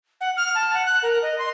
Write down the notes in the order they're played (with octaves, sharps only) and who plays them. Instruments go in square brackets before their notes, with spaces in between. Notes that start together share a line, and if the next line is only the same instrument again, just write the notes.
[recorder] F#5
F6
A5
F#5
F#6
A#4
D#5
C6